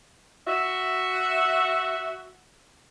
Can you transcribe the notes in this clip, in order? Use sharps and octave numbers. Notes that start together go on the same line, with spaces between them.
F#4 E5